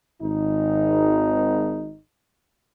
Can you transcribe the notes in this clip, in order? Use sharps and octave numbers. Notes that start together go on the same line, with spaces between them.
G#1 D#4